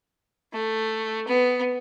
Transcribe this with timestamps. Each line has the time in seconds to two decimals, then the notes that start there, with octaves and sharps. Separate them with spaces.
0.53 A3
1.27 B3